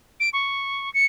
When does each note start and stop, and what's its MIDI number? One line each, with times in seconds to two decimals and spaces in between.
0.20 0.30 98
0.33 0.92 85
0.94 1.06 97